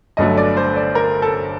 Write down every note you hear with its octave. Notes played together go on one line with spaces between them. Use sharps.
G1 G2 D3 F#3 A3 D#5
D5
C5
D5
A#4
A4